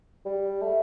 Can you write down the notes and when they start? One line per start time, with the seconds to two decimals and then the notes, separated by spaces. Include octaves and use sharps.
0.25 G3
0.61 A3